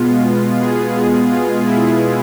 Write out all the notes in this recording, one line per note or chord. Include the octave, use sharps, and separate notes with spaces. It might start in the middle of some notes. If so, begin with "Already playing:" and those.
Already playing: B2 G#3 B3 F4
G#4
G#4
F4
E4